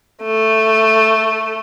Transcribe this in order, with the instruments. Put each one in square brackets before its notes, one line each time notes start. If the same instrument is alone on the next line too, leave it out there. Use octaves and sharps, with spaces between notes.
[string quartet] A3